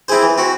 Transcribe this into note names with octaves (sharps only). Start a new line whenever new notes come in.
C4 E4 G#4 C5
E3
C4 F#4